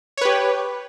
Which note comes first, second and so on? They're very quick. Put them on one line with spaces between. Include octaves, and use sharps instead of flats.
C#5 B4 G4